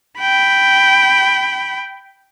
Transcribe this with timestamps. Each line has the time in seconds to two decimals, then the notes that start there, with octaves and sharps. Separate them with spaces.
0.20 G5 B5